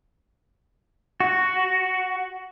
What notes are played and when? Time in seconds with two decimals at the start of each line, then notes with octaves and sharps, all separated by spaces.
1.20 F#4